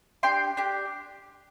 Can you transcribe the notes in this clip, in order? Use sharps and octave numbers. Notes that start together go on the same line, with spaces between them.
D4 G4 G5 C6
D4 G4